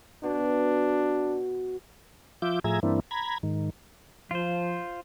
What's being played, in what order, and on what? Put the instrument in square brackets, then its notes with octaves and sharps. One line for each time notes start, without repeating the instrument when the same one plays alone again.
[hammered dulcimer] B2 [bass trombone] D4
[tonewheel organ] F3 F4 E5 D6 G6
A2 F3 G#4 E5 A#5 G#6
G2 E3 A#3 C4 D4 E4
A#5 B5 G#6
G#2 D#3
[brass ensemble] F3 [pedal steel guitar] F4 C5